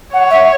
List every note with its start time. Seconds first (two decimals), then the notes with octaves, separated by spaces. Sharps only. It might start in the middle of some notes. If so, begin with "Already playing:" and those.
0.14 C#5 F#5
0.31 E5